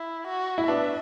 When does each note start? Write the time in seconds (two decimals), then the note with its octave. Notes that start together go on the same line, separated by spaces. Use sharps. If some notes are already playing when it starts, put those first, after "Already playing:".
Already playing: E4
0.27 F#4
0.58 E4
0.68 B3 D4 E5